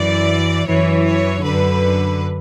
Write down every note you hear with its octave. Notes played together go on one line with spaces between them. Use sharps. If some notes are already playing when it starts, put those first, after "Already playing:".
Already playing: F#2 E3 D5
F#2 E3 C#5
C#5
F#2 D3 B4